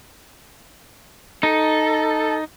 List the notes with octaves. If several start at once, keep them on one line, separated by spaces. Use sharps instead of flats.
D#4 A4